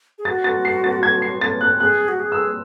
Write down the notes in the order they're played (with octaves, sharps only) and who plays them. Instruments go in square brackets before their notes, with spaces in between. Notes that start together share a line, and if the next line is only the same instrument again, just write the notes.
[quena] G#4
[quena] F#4 [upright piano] A6
[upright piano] A6
C7
A6
G#6
C7
A6
F#6
[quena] G#4 [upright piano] F#6
[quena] F#4
G#4
[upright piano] E6